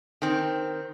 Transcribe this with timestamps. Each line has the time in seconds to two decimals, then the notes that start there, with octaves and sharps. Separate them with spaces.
0.22 D#3 C4